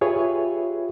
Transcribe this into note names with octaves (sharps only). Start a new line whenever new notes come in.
F4 G4 G#4 B4 C#5 E5